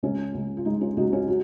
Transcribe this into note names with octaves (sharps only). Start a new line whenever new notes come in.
C#2 C#4
C#2
F4
G#3 D#4
C#4 F4
C#2 D#4 F#4
C#4 F4
F#4